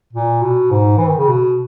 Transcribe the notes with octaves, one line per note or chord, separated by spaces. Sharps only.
A#2
B2
G#2
E3
D#3
C#3
B2